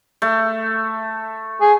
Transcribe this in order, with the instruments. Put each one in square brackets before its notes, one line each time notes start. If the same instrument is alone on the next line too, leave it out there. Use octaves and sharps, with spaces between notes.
[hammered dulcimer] A3
[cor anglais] G#4